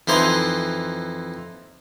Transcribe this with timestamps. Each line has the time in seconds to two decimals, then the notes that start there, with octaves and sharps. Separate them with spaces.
0.08 F2 E3 D#4 C5